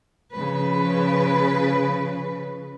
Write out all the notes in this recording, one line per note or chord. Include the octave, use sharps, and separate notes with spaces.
C#3 F3 B4